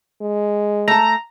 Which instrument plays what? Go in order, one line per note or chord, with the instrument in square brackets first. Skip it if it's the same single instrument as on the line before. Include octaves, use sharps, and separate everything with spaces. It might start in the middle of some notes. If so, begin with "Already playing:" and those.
[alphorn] G#3
[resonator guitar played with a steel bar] A3 A5 [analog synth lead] A#5